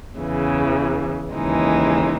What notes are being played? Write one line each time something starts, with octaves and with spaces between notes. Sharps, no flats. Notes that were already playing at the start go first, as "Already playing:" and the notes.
E2 C#3 E3
D#2 C#3 E3 G#3 D#4